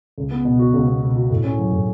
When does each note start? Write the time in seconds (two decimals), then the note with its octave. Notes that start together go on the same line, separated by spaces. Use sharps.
0.18 C#2
0.31 B3
0.45 B2
0.59 F#4
0.73 C#2
0.87 B3
1.03 B2
1.15 F#4
1.30 A2
1.44 C#4
1.58 F#3
1.72 A2